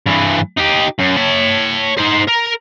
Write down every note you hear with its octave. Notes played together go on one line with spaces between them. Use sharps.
G2 E3
D#4 G4
F#2
C#5 A5
D#4 C5
A#4